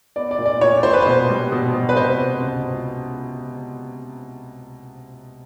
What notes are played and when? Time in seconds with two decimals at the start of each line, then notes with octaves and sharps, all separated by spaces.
0.16 B3 D5
0.31 D5
0.38 A#2
0.46 D5
0.61 A#2 C#5
0.83 A#2 C5
0.93 B4
1.02 B2 C5
1.29 G3
1.52 B2
1.74 B2
1.89 B4
1.96 C3 C5
2.19 C3
2.42 C#2